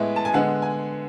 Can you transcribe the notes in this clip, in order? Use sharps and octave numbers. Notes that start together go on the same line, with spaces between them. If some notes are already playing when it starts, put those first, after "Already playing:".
Already playing: A2 G#3 B3 E5
A5
G#5
D3 G#3 B3 F#5
G#5